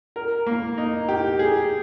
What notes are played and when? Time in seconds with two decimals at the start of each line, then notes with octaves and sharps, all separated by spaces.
0.16 A#4
0.46 A#3
0.78 D#4
1.08 G4
1.39 G#4